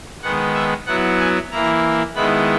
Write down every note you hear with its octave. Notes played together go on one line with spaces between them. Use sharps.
D#3 G#3 B3 F#5
E5
F#3 B3 E4 F#5
G#5
E3 A#3 E4 A#5
D#3 G#3 B3 E4 B5